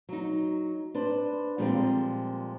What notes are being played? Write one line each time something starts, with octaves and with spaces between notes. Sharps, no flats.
F#3 D#4
D4 B4 C5
A#2 F3 G3 G#3 A#3 C4